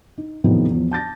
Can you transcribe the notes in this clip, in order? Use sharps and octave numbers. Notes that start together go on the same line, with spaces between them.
D#4
E2 A2 C3 D#3 F3 B3
E2 F3
A5 G6 A6 A#6